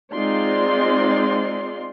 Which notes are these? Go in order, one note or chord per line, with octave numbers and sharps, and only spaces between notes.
G#3 C4 D#4 F4 D5 C6